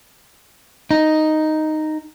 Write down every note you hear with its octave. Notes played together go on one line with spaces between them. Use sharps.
D#4